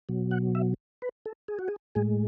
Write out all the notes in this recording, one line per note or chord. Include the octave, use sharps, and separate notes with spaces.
B2 F#3
F#5
E5
B4
A4
G#4
F#4
G#4
A2 G#3 G#4